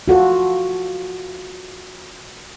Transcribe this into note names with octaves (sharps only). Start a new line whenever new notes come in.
F4 F#4 A4